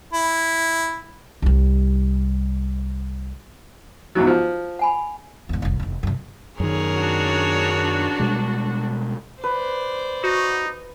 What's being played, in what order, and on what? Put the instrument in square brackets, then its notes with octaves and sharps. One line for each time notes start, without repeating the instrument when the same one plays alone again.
[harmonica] E4
[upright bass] C2 G3
[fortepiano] E2 G#2 F#3
F3
[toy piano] F#5 G#5 B5
[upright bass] E2 G#2
F1 C2
F1 E2
F#2 C3
[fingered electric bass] F#2 D#3 [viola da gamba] G#4 A#4 C#5
[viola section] D4 F#4
[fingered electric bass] B2 G3 G#3
[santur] B4 [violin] C5 D5
[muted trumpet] D#4 [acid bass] F#4